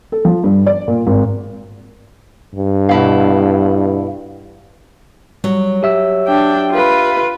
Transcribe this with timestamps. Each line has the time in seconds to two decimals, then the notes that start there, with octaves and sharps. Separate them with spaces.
0.12 A4
0.25 F3
0.44 G2
0.66 D5
0.88 A#2
1.07 G#1
2.55 G2
2.89 B2 E4 F5
5.44 F#3 G3
5.83 G4 E5 E6
6.27 D4 G5
6.72 F4 B4